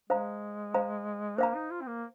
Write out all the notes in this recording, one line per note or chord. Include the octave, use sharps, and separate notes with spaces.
G#3 C5 F5 A#5
C5 F5 A#5
A#3 C5 F5 A#5
D#4
F4
C4
A#3